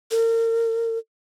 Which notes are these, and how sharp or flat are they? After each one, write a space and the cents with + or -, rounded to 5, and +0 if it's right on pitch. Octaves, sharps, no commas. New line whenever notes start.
A#4 -35